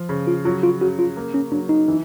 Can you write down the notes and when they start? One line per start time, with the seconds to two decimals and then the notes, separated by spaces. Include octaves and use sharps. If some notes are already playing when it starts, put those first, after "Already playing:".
Already playing: F3
0.09 C#3
0.27 F4
0.45 F#3 F4
0.63 F4
0.81 C#3 F#4
0.99 F4
1.17 A#3
1.34 C#4
1.52 F#3 D4
1.69 D#4
1.88 E3